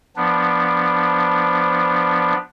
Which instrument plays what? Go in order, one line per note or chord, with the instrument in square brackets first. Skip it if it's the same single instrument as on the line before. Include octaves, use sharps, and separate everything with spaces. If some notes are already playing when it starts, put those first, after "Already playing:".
[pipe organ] F3 B3 D4